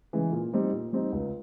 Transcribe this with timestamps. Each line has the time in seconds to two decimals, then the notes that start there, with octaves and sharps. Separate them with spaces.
0.13 C#3 E3 G#3
0.33 A#2
0.53 G3 C4 D#4
0.72 A#2
0.93 G3 C4 D#4
1.12 C#2